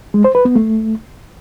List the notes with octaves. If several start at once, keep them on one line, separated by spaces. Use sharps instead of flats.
G#3
C5
B4
B3
A3